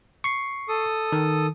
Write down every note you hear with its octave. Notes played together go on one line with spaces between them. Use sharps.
C#6 C7
A4 D#6
D#3